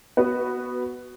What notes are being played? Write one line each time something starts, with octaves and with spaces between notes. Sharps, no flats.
B3 F#4 B4